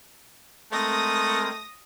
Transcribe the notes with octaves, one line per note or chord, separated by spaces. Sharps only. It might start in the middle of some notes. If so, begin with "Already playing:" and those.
G#3 A3 C4 A#4 D#6 A#6